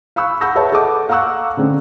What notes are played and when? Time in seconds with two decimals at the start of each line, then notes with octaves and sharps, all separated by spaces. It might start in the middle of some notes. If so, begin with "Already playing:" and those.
0.16 F5 B5 C#6 E6 F#6
0.41 F#5 B5 C#6 E6 G6 A#6
0.55 G#4 B4 C#5 E5 A5
0.72 A4 D#5 F#5 A5 D6
1.09 F5 F#5 A#5 C#6 E6 F#6
1.57 D3 A3 C4 C#4